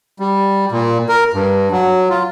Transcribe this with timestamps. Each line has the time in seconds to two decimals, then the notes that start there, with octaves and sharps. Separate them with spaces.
0.20 G3
0.72 A#2
1.09 A#4
1.34 G2
1.72 F#3
2.09 F4